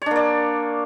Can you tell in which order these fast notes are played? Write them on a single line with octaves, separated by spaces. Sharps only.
C#5 D4 A#3 D5